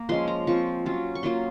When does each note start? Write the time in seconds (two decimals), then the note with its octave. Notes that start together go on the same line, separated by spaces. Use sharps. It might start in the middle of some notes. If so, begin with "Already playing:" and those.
Already playing: A#3 A#5
0.09 F3 G#3 C#4 C6
0.28 A#5
0.47 F3 C4 F4 C#6
0.86 F#3 C#4 F4
1.15 C#6
1.23 F#3 A#3 C#4 F4 C6